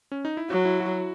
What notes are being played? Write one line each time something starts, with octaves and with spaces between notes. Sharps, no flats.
C#4
D#4
E4
F#3 F#4
E4
F#4